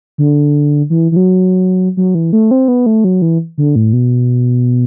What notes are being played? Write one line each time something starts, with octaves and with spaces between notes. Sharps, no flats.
D3
E3
E3
F#3
F#3
E3
A3
C4
B3
A3
F#3
E3
D3
A2
B2